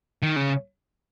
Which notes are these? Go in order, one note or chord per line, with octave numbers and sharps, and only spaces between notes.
D#3
C#3